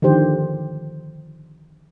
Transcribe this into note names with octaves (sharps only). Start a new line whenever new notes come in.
D3 D#3 F3 G4 C5